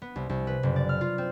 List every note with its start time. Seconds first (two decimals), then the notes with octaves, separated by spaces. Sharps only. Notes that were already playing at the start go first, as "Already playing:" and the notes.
0.02 B3
0.16 C2
0.29 C2
0.47 B4
0.63 F#1
0.76 D5
0.89 F6
1.01 F4
1.18 C4